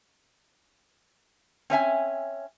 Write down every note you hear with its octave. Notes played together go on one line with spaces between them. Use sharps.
C4 C#4 E5 G#5